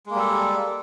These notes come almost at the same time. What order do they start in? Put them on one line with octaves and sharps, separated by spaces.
G#3 A#3 G3 A4